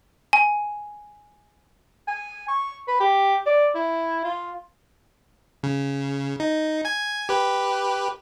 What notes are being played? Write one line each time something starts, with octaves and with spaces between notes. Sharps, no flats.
G#5
G#5
C#6
B4
G4
D5
E4
F4
C#3
D#4
G#5 G#6
G4 B4